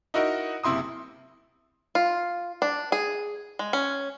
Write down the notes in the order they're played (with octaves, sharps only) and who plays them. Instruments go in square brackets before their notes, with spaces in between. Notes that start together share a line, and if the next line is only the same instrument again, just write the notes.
[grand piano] D#4 E4 F#4 A#4 D#5
F#1 C3 E4 C6 D#6
[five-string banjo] F4
D4
G#4
G#3
C#4